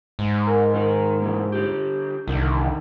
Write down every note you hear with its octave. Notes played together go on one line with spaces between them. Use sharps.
G#2
A#4
D#3 D#4 A#4
B2 E3 A#3
D3 G4
C2 D3 D#3